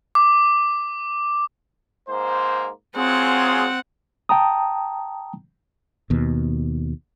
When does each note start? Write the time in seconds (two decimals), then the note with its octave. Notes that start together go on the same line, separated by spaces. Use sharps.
0.15 D6
2.08 G#2 A#3 C5
2.95 F#3 C4 F4 G#4 F#5
4.29 G5 A5 A#5 D#6
6.10 D#2 B2